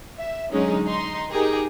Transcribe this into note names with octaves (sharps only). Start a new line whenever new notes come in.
E5
D3 F#3 G#3 C#4 D#4
D#4 C6
D#4 G4 G#4 A#4